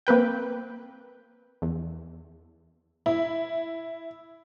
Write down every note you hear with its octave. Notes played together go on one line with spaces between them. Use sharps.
A#3 C4 B4 G5
E2
E4